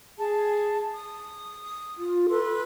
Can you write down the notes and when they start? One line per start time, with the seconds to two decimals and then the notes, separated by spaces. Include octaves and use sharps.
0.18 G#4 A5
0.94 D#6
1.98 F4
2.30 A4 B4 C6